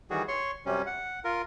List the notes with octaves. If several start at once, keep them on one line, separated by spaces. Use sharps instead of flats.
D#3 E3 G3 F#4 G#4
C#5 C6 C#6
F#2 C3 G3 C#4
F#5
F4 A#4